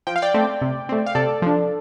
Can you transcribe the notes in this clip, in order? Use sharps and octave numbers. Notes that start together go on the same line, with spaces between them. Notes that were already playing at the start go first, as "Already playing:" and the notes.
F3 G5
F5
D5 G5
A3 C4
C3
A3 C4
F5
C3 A4 D5
F3 D4